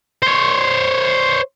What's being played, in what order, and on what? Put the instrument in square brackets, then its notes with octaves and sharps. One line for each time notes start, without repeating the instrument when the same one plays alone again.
[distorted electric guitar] C5 C#5